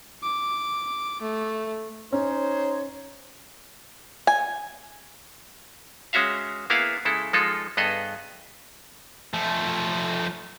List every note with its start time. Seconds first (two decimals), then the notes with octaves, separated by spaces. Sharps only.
0.23 D6
1.22 A3
2.12 C#4 D#4 C5 C#5
4.27 G#5
6.13 G#3 C#4 F#4 E5 F5
6.70 A#3 B3 E4 G#4 F5 F#5
7.05 C#3 G#3 E4 A4
7.33 F3 G#3 D#4 F4 A4
7.77 G2 B3 G#4 A4 D#5
9.34 F3 A3